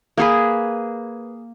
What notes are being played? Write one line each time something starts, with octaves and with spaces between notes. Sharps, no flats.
A#3 G#4 B4